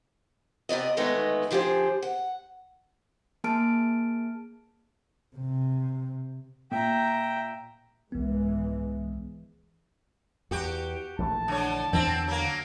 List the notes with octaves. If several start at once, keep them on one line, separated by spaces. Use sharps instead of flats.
C3 B3 D5 D#5
D2 D#3 G#3 A3 B3 D#4
D3 F3 G4 G#4 C5
F#5
A#3 G#4 A5 F6 D7
C3
A#2 E5 G5 A#5
C2 G#2 E3 G#3 B3
E2 F#4 G4
A#1 E3 A3 A5
D3 C#5
E2 D3 E3 C4 D4
F#3 A#3